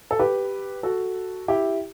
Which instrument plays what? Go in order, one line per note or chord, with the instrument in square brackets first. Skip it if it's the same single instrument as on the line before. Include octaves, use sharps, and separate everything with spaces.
[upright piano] A4
G4 B4
F#4 A4
E4 G4